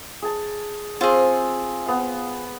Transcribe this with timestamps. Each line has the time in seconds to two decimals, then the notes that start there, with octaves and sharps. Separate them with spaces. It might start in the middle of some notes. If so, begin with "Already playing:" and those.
0.22 G#4 A5
1.01 C4 F4 G#4
1.86 B3 F5